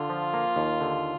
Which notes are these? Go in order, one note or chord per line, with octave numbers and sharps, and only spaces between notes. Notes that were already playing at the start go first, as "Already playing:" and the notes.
Already playing: D3 F4
F3
A#3
D#2
D3